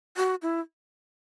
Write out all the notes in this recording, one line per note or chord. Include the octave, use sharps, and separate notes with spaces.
F#4
E4